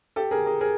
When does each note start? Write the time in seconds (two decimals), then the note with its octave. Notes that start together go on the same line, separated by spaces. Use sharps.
0.16 G4 A4
0.31 G#4 A#4
0.46 G#4 A#4
0.61 G#4 A#4